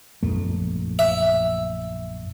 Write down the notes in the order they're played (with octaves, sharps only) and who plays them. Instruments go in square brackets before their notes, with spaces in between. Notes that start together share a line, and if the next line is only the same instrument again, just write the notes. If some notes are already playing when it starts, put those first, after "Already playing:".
[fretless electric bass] A#1 F#2 A3
[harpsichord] E5